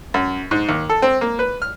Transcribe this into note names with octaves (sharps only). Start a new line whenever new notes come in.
F#2
G#2
D#2
A4
C4
A#3
B4
F6